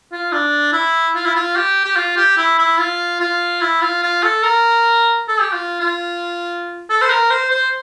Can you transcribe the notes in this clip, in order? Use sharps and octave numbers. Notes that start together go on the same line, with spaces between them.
F4
D4
E4
F4
E4
F4
G4
G4
F4
G4
E4
E4
F4
F4
E4
F4
F4
A4
A#4
A4
G4
F4
F4
A4
C5
A#4
C5
C5